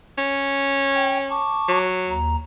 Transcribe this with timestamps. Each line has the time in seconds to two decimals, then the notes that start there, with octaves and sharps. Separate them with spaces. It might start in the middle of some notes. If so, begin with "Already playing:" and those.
0.18 C#4
0.94 G5
1.30 A5 C#6 D6
1.68 F#3
2.09 D#2 A#5